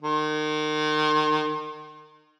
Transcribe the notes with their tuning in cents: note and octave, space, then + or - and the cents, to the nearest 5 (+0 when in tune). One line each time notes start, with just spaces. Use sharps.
D#3 -30